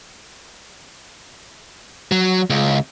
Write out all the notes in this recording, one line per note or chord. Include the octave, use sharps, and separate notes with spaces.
F#3
C#2